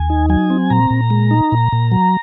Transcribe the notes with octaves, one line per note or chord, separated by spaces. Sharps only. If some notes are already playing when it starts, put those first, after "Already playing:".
Already playing: D#2 G#5
D#4
F#3 G#5
C4
A#2 A#5
A#2
G#3
D#4
A#2
A#2
F#3